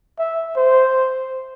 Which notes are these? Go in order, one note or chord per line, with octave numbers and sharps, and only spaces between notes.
E5
C5